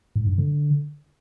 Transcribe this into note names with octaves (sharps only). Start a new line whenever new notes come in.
G#2
G2
D3